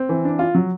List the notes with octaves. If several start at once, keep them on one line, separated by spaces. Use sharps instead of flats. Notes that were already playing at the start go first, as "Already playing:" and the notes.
Already playing: C4
E3
D4
F4
F#3